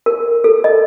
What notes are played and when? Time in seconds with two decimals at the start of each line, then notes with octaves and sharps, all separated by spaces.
0.06 A#4
0.44 A4
0.64 D#5